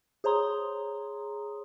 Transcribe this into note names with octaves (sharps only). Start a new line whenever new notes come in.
G#4 C5 C#5 A#5 C6 D#6